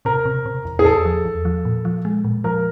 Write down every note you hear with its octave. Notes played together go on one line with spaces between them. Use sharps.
C3 A#4
C3
C3
E2
G#4
E2 A4
F3
E2
F3
A#2
F3
G#3
A#2
F3 A#4